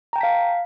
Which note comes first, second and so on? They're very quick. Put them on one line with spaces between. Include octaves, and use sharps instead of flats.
A#5 G5 A5 B6 F5